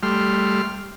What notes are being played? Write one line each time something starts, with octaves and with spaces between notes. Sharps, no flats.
G3 A3 C6 F6